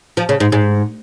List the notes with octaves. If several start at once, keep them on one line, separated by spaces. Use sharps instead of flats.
F3
C#3
G#2
G#2